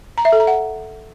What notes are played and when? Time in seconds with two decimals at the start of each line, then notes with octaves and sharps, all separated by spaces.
0.18 A#5
0.25 E5
0.32 A4
0.40 A#5
0.47 F#5